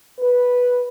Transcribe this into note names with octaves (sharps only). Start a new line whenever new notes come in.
B4